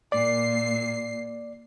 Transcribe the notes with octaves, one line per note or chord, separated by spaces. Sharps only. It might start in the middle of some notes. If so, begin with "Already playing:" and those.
A#2 D5 C7